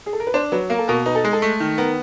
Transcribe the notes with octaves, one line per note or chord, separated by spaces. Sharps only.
G#4
A4
A#4
B4
D4 C5
F#3 B4
A#3 A#4
A4
B2 A#4
D#4 B4
A4
G#3 G#4
A4
A3
D#3
B3 A#4